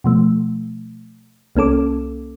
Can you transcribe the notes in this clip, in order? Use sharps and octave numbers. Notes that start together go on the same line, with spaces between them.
B2 F3 A3
C2 A#3 C#4 A4 D6